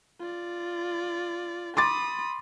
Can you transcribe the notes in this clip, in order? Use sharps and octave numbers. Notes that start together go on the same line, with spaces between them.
F4 D5
B5 C6 D6 D#6 A6